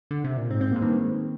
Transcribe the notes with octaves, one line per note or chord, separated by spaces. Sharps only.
D3
C3
A#2
G#2 C4
C4
A#3
G#2
G2 D#3
G#2